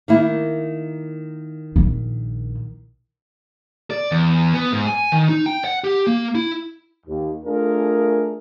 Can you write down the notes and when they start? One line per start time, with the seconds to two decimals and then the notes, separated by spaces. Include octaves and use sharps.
0.08 D#3 A#3 E4
1.76 A#1
3.91 D5
4.12 E2
4.54 B3
4.73 G#2
4.87 G#5
5.12 D#3
5.29 D#4
5.46 G5
5.65 F#5
5.84 G4
6.07 A#3
6.35 E4
7.06 D#2
7.44 A3 D4 F4 G#4 A#4